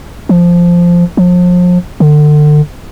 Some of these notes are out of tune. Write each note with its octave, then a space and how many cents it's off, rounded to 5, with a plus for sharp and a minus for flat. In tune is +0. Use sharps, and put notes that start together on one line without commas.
F3 -5
F3 +35
D3 +30